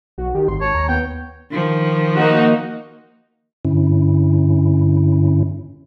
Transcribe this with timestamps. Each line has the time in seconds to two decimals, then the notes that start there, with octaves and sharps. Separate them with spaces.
0.18 B1 F#4
0.35 D#3 G4
0.48 G#1 C6
0.61 C#5 A5
0.74 D#2 A#5
0.89 B3 G5
1.51 D#3 F3
2.17 A#3 D#4 F#4
3.65 G2 D3 C#4 E4